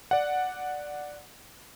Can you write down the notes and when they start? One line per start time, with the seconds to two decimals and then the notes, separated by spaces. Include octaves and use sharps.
0.11 D5 F#5